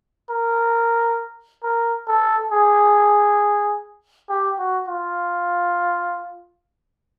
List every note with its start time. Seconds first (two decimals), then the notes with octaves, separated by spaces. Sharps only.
0.30 A#4
1.63 A#4
2.07 A4
2.52 G#4
4.30 G4
4.59 F#4
4.88 F4